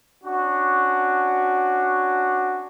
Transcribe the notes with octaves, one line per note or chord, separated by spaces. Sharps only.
C#4 D4 F#4